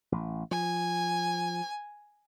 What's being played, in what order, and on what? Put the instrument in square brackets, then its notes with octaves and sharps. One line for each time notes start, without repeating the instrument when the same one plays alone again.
[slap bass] A1
[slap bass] F3 [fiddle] G#5